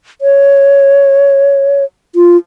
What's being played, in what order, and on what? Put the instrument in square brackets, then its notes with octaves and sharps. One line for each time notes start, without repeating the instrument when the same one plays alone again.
[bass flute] C#5
F4